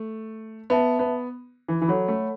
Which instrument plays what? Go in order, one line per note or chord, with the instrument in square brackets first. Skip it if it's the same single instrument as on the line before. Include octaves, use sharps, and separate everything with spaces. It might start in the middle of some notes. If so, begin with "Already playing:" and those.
Already playing: [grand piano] A3
[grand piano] B3 [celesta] B4 E5 A5
[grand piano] B3
E3
E3
[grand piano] F#3 [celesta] A4 C#5 F#5 B5
[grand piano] A3